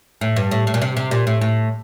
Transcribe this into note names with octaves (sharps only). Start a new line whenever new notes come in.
A2
G2
A2
A2
A#2
C3
C3
A#2
A2
A2